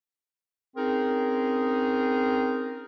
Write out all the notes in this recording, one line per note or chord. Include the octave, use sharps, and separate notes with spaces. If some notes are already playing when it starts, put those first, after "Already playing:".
C4 C#4 D#4 G#4 A#4